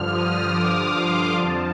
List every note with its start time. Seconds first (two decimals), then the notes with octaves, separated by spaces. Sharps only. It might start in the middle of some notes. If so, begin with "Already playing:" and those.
Already playing: G2 D3 F3 F6
0.09 D#6
0.50 D6
0.92 C6
1.34 F2 D3 F3 A5